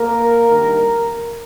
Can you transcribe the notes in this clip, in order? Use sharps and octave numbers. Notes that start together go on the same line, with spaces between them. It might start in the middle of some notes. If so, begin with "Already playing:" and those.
Already playing: A#3 A#4
G2 D#3 A#3